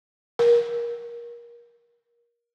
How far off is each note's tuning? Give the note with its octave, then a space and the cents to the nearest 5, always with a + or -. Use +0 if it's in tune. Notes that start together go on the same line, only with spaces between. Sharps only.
A#4 +25